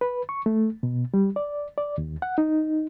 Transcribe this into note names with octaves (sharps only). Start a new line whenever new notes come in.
B4
C#6
A3
B2
G3
D5
D5
D#2
F#5
D#4